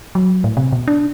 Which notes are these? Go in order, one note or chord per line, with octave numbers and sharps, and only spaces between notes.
F#3
A2
C3
B2
D4